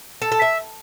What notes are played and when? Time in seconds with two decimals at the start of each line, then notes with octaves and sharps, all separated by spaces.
0.22 A4
0.32 A4
0.42 E5